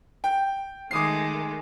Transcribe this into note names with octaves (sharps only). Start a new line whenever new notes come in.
G5
D#3 G#3 A3 D6 D#6 C7